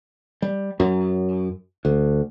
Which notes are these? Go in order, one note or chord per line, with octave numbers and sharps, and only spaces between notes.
G3
F#2
D2